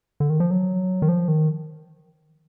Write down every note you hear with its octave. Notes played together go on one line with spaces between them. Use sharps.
D3
D#3
F3
F#3
D#3
F3
D#3